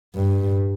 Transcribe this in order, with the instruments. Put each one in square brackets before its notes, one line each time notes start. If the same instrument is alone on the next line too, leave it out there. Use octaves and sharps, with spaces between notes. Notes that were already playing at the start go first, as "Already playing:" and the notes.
[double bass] G2